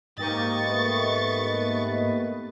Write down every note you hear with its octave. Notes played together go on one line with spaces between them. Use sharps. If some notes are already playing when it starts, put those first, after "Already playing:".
G#2 A#3 G4 D#5 C#6 A6
A3 B3 B4